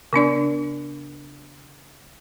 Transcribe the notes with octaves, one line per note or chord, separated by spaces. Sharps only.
C#3 B3 D4 D5